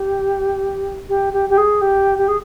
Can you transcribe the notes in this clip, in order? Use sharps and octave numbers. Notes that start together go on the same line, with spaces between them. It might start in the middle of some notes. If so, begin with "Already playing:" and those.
Already playing: G4
G4
G4
G4
G#4
G4
G4
G#4